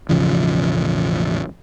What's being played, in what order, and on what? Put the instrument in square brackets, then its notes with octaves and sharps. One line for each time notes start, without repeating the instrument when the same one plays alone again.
[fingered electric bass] E1 A1 C#3 F3